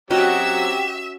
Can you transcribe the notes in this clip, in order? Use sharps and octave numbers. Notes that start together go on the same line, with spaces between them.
F#3 C4 C#4 F#4 G4 D#5 E5 E6